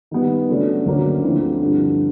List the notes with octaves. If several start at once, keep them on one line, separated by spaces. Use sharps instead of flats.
D#3 G3 B3
C#3 F#3 A3 D4
D2 D3 F#3 A#3 C#4
D3 F3 A3 C4 E4
G2 D3 F3